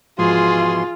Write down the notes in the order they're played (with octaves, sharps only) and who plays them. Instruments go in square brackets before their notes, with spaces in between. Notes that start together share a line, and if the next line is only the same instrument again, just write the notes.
[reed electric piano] G#2 F3 [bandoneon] B2 E3 C6 [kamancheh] F4 [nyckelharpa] G#4